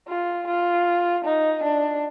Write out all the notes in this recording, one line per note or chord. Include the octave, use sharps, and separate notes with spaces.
F4
F4
D#4
D4